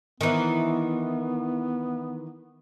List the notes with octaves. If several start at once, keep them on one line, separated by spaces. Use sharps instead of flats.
D#3 E3 B3